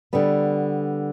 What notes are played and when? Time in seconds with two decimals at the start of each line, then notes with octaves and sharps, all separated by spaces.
0.13 D3 G3 B3